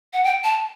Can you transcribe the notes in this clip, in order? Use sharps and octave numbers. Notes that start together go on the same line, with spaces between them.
F#5
G5
A5